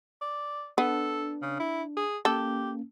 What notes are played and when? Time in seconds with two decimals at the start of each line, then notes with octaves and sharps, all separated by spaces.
0.21 D5
0.78 B3 D4 A4
1.42 C#3
1.59 E4
1.97 G#4
2.25 A#3 C#4 G4 A4